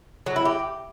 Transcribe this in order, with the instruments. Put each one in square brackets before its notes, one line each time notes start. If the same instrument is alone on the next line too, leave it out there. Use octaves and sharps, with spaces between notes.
[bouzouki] F#3
E4
G4